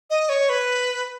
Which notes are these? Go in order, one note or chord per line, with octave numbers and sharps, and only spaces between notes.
D#5
C#5
B4